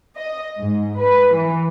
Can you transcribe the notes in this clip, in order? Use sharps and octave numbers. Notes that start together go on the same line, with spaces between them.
D#5
G#2
B4
E3